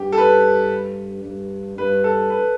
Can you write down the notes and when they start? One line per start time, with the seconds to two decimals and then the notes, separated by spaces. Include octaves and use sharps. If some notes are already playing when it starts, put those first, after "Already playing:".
Already playing: G2 G4
0.12 A4
0.18 B4
1.24 G2
1.78 G2 B4
2.04 A4
2.30 B4